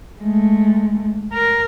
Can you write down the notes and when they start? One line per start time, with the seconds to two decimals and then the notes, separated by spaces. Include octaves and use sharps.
0.21 G#3 A3
1.33 A#4